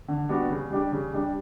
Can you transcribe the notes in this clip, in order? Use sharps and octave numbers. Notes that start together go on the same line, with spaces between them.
D3
G3 B3 D4 F#4
C#3
G3 D4 G4
C#3
G3 D4 G4